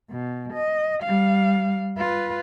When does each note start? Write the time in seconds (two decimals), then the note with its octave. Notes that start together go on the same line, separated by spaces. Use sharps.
0.11 B2
0.53 D#5
1.03 G3 F5
1.98 F4 B4